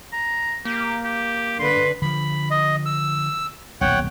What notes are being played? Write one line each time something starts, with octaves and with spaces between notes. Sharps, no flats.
A#5
A#3 G4
G4
D3 B4 C6
D3 F3 B5
D#5
E6
D#1 B1 C#5 F#5 G5